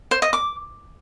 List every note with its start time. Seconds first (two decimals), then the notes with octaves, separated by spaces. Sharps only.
0.11 C5
0.22 D#5
0.33 D6